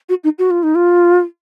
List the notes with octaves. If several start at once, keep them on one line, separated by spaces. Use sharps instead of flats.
F#4
D#4
F#4
F4
D#4
F4